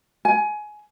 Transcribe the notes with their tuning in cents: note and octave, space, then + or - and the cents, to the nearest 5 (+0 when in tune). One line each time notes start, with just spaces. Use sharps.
G#5 +20